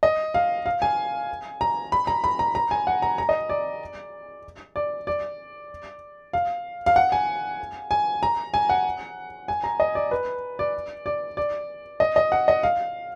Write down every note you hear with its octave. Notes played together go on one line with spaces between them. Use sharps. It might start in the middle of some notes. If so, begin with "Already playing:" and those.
D#5
F5
F5
G#5
A#5
B5
A#5
B5
A#5
A#5
G#5
F#5
A#5
A#5
D#5
D5
D5
D5
F5
F5
F#5
G#5
G#5
A#5
G#5
F#5
G#5
A#5
D#5
D5
B4
D5
D5
D5
D#5
D#5
F#5
D#5
F5